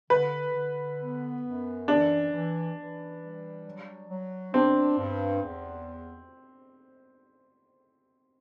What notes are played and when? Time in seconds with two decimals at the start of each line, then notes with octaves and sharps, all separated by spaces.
0.10 D3 B4
0.55 D3
1.00 B3
1.44 F#2
1.88 E3 D4
2.32 E3
2.77 E3
3.21 G3
3.66 F#3
4.10 F#3
4.53 C4 D4
4.98 G2
5.43 E2